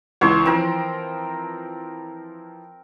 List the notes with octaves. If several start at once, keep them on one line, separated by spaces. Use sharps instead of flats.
C#2 E3 C#5 C6
E3 F3 C4 A#4